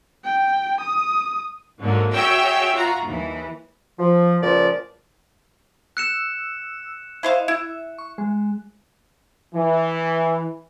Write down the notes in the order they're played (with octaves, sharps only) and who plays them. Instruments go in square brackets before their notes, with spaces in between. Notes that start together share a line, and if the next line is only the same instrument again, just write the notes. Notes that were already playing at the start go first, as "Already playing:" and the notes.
[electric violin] G5
D#6
[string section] G#2 D3 F#3 A#3
F#4 G#4 C#5 E5 G5 E6
F4 F#4 A#5
D#2 E3
[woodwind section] F3
C#2 A#2 F3 D5
[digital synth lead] E6 [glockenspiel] F#6 C#7 E7
[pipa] E4 C5 F5 [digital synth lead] D#5
[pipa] E4 [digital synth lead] E5
[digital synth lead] C#6
G#3
[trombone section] E3